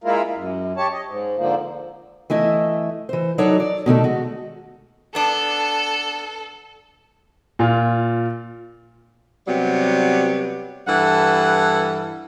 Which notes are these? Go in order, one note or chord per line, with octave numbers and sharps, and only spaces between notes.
G#3 A#3 E4 F4 A#4
F#2
G4 C#5 A5
D#5
G#2
G#2 D3 F3 A#3
E3 A3 E4 D#5
E3 C5
F#3 D#4 F#4 A4 C#5 D5
D5
B2 D#3 A3 A4
G#3 F#4
B3 D4 A4
A#2 F4
C3 F#3 G3 B3 G4
G2 E3 A4 F#5